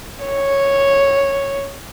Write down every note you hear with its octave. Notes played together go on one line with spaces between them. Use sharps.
C#5